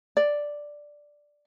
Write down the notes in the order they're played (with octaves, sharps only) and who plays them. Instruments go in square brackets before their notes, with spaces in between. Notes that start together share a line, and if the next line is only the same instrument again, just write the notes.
[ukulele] D5